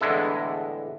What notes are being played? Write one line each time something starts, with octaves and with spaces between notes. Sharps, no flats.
E2 A2 D3 G#3 E4 A4